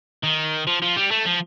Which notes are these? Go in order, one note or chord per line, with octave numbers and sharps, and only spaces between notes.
D#3
F3
F3
G3
A3
F3